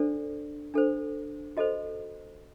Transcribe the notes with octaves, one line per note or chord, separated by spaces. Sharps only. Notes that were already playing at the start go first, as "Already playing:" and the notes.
Already playing: D4 A4 C5 D5
D4 A4 C5
F#4 A4 C5 D#5